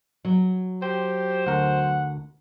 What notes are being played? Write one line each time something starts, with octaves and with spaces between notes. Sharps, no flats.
F#3
G4 C5 G5
D2 A#4 F#5